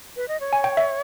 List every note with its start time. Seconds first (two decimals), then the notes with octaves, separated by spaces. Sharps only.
0.16 B4
0.28 D#5
0.40 C#5
0.53 G#5
0.64 G5
0.77 E5